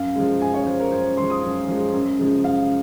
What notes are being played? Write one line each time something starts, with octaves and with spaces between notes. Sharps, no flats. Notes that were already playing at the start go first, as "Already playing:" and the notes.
Already playing: F#2 F5
F3 G#3
F#2 G#5
C#5
F3 G#3 C5
A#4
F#2 C5
F3 G#3 C6
D#6
F#2
F3 G#3
F#2
C#3 F3 G#3
F#2 F5